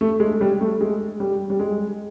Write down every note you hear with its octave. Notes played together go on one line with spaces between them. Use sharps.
A3
G#3
G3
A3
G#3
G3
G3
G#3